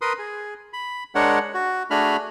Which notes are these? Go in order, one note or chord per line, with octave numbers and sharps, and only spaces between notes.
A#4 B4 C6 D#6
G#4
B5
G#3 D4 A#4 C#5 F#5
F#4
A3 D4 F#4 G#4 B5 F6